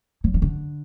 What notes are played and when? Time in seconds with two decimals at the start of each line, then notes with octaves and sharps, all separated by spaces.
0.24 F#3
0.34 F3
0.42 D3